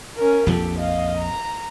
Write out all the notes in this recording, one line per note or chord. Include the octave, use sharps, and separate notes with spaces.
C#4 A#4
A#1 F2 F3 G4 A4
D#5 F5
A#5